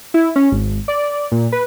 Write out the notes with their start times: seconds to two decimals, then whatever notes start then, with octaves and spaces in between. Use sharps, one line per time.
0.14 E4
0.36 C#4
0.52 G#1
0.88 D5
1.32 A#2
1.52 B4